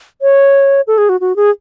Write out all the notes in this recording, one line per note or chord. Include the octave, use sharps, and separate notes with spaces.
C#5
A4
G#4
F#4
F#4
G#4